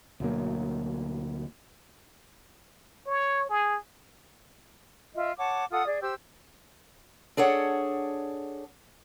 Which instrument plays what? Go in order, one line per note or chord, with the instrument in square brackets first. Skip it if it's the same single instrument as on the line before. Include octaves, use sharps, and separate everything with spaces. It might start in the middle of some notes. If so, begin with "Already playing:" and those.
[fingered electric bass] D2 B2 F#3 A#3
[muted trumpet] C#5
G#4
[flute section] F4 D#5 E5
C#5 F#5 A5 D6
F4 A4 F#5 D#6
G#4 D5
G4 C5 E6
[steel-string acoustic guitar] D4 G#4 A4 C#5 F#5